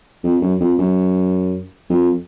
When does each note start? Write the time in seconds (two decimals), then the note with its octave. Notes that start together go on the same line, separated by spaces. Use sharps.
0.24 F2
0.42 F#2
0.60 F2
0.79 F#2
1.90 F2